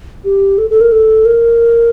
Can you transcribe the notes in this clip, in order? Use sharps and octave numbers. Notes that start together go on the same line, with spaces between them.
G4
A4
A4
A#4
A4
A#4